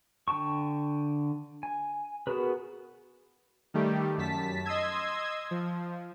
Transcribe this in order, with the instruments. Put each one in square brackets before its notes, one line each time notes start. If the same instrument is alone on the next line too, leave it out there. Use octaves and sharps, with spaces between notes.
[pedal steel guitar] D3 G5 A5 C#6
G#5
B3 F#4 G#4 A#4 B4
[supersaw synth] D#3 G3 A3 G4
F#2 A5 B6
D#5 C6 D#6 E6 G#6
F3